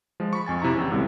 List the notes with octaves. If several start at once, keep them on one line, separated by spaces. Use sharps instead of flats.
F3 G#3
B5 C#6
F2 G#5 A6
C3 E4 A#5 C#6
E2 C#3
C#2 A2 C3 G3